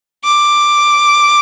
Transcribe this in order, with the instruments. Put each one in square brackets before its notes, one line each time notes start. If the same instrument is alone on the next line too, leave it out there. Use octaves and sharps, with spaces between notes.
[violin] D6